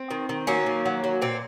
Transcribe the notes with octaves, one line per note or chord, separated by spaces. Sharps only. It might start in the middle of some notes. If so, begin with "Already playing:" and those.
Already playing: C4
D#3
D#3
F#3 A#3 C#4
D#3
F#3
F#3
A#2 C4